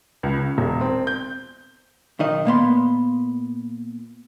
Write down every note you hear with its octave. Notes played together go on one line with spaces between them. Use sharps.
C#2
C#3
E1
C4
G6
B1 D#3 D#5
A#2 A#3 B3 C6